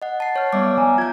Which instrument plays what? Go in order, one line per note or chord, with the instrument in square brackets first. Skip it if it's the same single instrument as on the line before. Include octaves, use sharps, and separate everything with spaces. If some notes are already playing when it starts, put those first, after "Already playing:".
[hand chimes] D#5 F#5
A5 C7
C#5 F6
[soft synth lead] G3 [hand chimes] B3 E5 D6
[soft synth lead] G#5 [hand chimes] A#5
[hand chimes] F4 G6 [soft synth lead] G#6